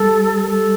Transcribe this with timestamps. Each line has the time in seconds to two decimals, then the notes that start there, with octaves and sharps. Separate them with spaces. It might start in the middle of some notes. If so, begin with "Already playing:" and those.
Already playing: G3 A4
0.49 A4